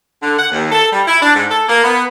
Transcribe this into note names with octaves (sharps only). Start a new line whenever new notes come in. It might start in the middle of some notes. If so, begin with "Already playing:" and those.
D3
F#5
D#2
A4
G3
E4
D4
G#2
A4
A#3
B3